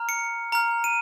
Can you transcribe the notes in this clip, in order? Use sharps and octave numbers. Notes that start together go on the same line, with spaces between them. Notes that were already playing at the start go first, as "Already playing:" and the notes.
Already playing: A#5 F6
C#7
A#5 F6
D#7